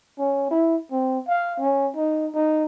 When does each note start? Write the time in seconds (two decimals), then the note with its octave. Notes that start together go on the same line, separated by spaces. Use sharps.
0.18 C#4
0.51 E4
0.92 C4
1.28 F5
1.60 C#4
1.96 D#4
2.34 D#4